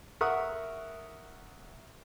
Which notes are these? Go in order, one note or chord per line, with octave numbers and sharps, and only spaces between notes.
A#4 E5 F#5 C#6 D#6